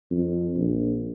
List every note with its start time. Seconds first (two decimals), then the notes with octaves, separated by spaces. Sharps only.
0.11 F2
0.56 A#1